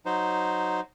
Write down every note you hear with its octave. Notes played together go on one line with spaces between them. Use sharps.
F#3 D#4 C5